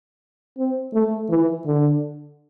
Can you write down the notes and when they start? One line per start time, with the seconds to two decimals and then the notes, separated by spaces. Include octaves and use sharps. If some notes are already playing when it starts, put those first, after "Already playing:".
0.58 C4
0.94 A3
1.30 E3
1.65 D3